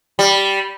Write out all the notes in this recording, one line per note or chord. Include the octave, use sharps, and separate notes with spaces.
G3